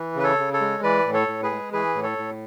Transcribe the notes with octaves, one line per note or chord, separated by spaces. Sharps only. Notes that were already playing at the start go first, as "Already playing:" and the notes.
Already playing: E3
C#3 B4
A4 C#5
C#3
A4 C#5
G#3
E3 B4 D5
A2
A4 C#5
A2
G#4 B4
G#3
E3 G#4 B4
A2
A4 C#5
A2